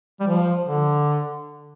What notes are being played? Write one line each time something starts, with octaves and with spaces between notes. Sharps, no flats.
G3
F3
D3